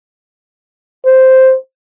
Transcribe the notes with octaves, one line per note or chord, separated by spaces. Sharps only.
C5